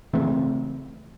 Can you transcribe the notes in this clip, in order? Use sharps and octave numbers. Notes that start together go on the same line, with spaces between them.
C#3 E3 A3 C4